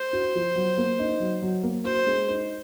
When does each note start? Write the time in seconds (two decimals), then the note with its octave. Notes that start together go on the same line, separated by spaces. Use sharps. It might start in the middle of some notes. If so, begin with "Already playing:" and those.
Already playing: C5
0.13 F#4
0.35 F3
0.56 F#3
0.77 A#3
0.99 D#4
1.20 F#3
1.42 F#3
1.63 A#3
1.85 F#4 C5
2.07 G#3
2.28 D#4